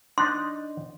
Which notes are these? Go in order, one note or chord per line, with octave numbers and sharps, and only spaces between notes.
D4 D#4 D#5 C6